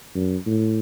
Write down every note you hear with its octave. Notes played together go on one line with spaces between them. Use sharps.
F#2
A2